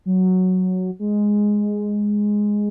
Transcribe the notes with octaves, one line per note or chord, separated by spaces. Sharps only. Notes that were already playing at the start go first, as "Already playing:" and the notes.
F#3
G#3